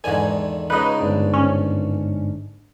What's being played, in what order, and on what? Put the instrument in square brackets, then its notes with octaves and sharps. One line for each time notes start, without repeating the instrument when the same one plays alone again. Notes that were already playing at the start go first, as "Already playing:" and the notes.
[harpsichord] E2 D3 D#3 [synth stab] G#2 G#5
[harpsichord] C#2 C#3 [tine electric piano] D#4 [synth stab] B4 D#5
[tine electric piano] G1 G#2 D4
[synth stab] C#4